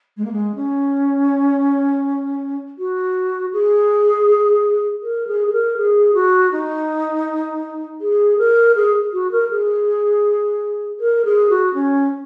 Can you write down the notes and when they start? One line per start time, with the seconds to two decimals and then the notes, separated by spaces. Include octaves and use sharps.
0.17 G#3
0.25 A#3
0.32 G#3
0.55 C#4
2.79 F#4
3.53 G#4
5.02 A#4
5.27 G#4
5.48 G#4
5.53 A#4
5.77 G#4
6.14 F#4
6.52 D#4
8.01 G#4
8.38 A#4
8.76 G#4
9.13 F#4
9.32 A#4
9.50 G#4
11.00 A#4
11.25 G#4
11.50 F#4
11.74 C#4